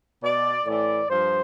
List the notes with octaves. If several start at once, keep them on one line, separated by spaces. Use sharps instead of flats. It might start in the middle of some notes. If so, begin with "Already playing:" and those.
B2 D5
A2 E3 D5
G2 F3 C5